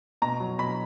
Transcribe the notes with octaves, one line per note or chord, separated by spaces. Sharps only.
B2 A#5
F#3
B2 B5